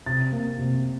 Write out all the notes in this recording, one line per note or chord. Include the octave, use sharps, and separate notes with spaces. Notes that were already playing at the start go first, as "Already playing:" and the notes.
C3 A6
A#3
C3